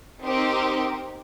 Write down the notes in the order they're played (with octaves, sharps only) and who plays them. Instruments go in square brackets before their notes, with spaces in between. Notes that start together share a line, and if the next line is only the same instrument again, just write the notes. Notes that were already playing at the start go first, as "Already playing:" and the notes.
[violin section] C4 D#4 G4 A#4